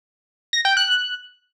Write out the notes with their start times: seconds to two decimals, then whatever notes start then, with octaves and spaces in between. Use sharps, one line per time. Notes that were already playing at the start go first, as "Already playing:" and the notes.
0.53 A#6
0.65 G5
0.77 F#6